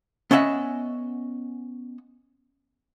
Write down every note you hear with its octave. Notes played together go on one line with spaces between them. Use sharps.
B3 C#4 D#5 E5 F#5